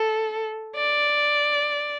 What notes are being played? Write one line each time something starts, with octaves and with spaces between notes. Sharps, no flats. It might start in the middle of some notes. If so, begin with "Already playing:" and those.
Already playing: A4
D5